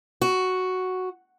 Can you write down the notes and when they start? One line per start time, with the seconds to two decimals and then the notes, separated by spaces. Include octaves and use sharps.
0.22 F#4